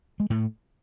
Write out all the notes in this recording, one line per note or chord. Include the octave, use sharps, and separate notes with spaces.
G#3
A2 A3